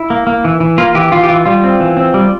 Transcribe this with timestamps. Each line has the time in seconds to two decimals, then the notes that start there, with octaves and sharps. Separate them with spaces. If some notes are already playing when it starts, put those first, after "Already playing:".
Already playing: E4
0.10 A#3
0.27 A#3
0.45 E3
0.60 E3
0.78 A#3 F4
0.95 E3 G4
1.12 E3 F4
1.23 G4
1.29 E3 F4
1.46 G3 F4
1.64 C4
1.80 E3
1.97 C4
2.14 G3